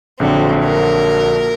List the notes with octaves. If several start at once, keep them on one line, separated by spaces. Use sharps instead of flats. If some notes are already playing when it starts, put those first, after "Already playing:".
A#1 D3 F#3 C4
A#4